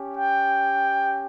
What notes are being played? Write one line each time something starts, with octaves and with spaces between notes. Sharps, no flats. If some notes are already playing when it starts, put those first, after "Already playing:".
Already playing: C#4 G4
G5